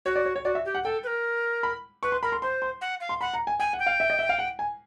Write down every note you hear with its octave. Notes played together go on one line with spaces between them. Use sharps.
F#4 C#5
D5
C#5
C#5
F#4 D5
E5
G4
F#5
A4 G5
B4
A#4
B5
B4 C#6
C6
A#4 B5
C6
C5 C6
C6
F#5
F5
C6
F#5 B5
A#5
G#5
G5 G#5
F#5
G5
F5
E5
D#5
E5
F5
F#5
G#5